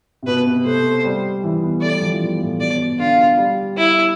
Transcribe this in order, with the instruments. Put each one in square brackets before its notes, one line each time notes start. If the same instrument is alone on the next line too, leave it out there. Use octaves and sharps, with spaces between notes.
[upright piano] C3
[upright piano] B2 [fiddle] B4
[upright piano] C3
[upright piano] A3 [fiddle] C5
[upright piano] G3
E3
B3
[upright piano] A3 [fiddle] D5
[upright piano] G3
F3
E3
B2
A2
[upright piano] B2 [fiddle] D5
[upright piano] B2
[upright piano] D3 [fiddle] F4
[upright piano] G3
[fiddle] E4